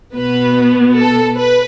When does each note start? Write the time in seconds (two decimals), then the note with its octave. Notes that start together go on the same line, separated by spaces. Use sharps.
0.15 B2 B3 B4
0.96 A4
1.37 B4